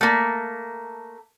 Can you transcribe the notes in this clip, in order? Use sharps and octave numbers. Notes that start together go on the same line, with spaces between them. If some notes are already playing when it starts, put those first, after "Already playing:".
A3 A#3